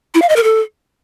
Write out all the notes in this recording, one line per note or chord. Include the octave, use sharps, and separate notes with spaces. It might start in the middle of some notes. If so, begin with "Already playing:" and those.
E4
F5
D#5
A#4
A4